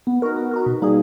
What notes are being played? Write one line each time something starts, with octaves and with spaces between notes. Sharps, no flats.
B3
D#4 F#4 A#4
B3
D#4 F#4 A#4
B2
G3 A#3 D#4 G#4